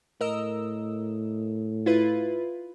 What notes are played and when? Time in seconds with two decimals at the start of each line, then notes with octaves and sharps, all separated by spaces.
0.21 A2 A#4 D#5 E6
1.86 E4 F4 B4